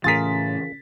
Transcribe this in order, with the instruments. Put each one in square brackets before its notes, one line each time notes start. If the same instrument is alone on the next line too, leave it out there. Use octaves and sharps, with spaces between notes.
[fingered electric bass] A2 E3 [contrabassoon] C#3 [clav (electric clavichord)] F4 G#4 A#4 [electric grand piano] A6 B6